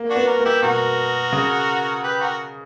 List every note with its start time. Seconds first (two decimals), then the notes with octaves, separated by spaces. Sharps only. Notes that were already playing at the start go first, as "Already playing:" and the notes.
Already playing: A#3
0.10 D4 F#4
0.16 B3
0.27 F#4 A#4
0.40 A#3
0.45 E4 G4
0.62 B2 F#4 A#4
1.32 C#3
2.03 G4 B4
2.21 F#4 A#4